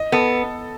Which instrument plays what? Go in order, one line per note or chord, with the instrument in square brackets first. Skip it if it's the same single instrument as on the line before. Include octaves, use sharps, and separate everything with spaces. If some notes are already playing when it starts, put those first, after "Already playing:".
Already playing: [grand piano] D#5
[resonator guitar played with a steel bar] B3 [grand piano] A4